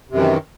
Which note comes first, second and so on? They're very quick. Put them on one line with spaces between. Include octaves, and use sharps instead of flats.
C3 F#2 E3 D#3